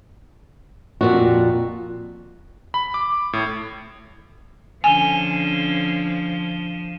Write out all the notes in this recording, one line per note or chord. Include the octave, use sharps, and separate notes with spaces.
F2 A#2 F#4
B5
D6
A2
D3 F3 C#4 G#5 D#7 E7 G7